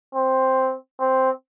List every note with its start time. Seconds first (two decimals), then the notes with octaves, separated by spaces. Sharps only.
0.15 C4
1.00 C4